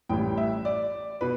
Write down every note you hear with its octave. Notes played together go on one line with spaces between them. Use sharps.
A1 A2 E3 G3 G5
E5
D5
B2 B4